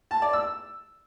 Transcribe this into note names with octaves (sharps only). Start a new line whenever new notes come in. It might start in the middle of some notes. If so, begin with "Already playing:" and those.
A5
D5
E6